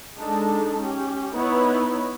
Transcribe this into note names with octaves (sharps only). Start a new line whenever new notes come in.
G#3 D4 D#4 A4 A5
C#4 G4
B3 D#4 E4 B4 C#5